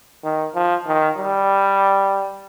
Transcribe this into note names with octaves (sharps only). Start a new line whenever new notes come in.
D#3
F3
D#3
G3